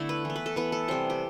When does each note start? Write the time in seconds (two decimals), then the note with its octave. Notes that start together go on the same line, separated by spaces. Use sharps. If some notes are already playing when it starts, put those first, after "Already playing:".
Already playing: D3 A3 B3 E4
0.09 B4
0.25 E3 B3
0.36 B4
0.46 A4
0.56 E3 B3 B4
0.72 A4
0.88 C3 G3 B3 C5
1.10 G4